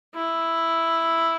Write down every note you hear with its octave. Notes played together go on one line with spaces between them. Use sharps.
E4